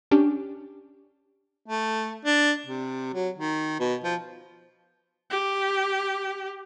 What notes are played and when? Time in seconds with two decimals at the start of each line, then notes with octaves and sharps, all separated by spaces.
0.11 C#4 D4 G4
1.67 A3
2.25 D4
2.66 C3
3.14 F#3
3.38 D#3
3.80 B2
4.04 F3
5.30 G4